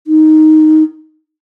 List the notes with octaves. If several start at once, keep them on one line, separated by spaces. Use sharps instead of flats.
D#4